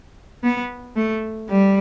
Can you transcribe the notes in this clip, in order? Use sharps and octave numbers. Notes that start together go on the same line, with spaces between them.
B3
A3
G3